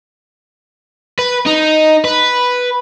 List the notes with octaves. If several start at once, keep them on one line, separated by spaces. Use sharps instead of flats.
B4
D#4
B4